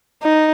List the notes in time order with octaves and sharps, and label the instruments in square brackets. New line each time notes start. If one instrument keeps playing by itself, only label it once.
[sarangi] D#4